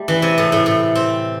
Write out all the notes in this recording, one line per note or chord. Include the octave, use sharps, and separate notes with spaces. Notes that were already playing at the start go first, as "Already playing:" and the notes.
Already playing: G3 A3
E3
C3
A2
A2
A2
C4